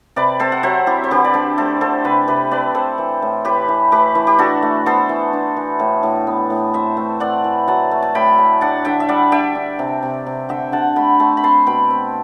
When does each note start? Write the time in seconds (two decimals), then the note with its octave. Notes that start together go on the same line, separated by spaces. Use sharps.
0.16 C3 B4 D5
0.40 C4 A4 C5
0.52 F#5
0.63 F#3 C5 E5
0.87 C4 E4 G4
1.04 C5
1.11 D3 G4 B4
1.25 D5
1.34 D4 A4 C5
1.57 A3 A4 C5
1.81 D3 A4 C5
2.04 C3 G4 B4
2.28 C3 G4 B4
2.51 C4 B4 D5
2.75 C4 A4 C5
2.98 E3
3.22 A2
3.45 A2 G4 B4
3.69 E3
3.92 A3 G4 B4
4.15 E3
4.27 G4
4.39 D4 F#4 A4
4.62 A3
4.86 B3 A4 C5
5.09 E3
5.33 D4
5.57 E3
5.79 A2
6.03 A2
6.27 B3
6.50 A2
6.74 C4 C5 E5
6.97 A3
7.20 C4 D5 F#5
7.44 E3
7.68 F#3 F#5 A5
7.91 A3
8.02 A5
8.15 A2 G5 B5
8.38 A3
8.61 D4 F#5 A5
8.85 D3 E5 G5
9.00 E5
9.09 G3 D5 F#5
9.31 D4 E5 G5
9.55 D4
9.79 C3
10.03 C3
10.26 C3
10.49 D3 E5 G5
10.72 D3 F#5 A5
10.96 A3 G5 B5
11.19 A3 A5 C6
11.37 B5
11.43 C4 A5 C6
11.66 B2 G5 B5
11.90 C4